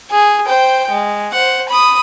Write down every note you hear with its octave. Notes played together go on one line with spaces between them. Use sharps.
G#4
C5 G5
G#3
C5 F#5
B5 D#6